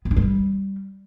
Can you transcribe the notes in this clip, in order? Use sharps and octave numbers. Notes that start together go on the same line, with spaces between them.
B3
D4
G#3
G3